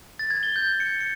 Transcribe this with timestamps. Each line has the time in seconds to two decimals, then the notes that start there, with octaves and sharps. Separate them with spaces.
0.19 A6
0.30 G#6
0.43 G7
0.56 G6
0.80 C#7
1.01 C#7